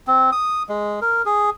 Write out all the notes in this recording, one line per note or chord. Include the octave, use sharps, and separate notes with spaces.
C4
D#6
G#3
A#4
G#4